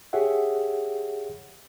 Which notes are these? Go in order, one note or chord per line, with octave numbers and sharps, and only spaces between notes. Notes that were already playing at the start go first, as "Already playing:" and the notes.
G4 G#4 C#5 E5 F#5